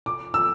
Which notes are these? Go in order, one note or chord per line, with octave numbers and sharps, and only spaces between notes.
D6
E6